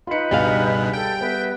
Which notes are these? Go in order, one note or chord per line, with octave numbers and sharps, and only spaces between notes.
D#4 F4 B4 B5 C#7
C#2 G2 B2 G3 G#4 F5
A4 G5
B3 B4 E5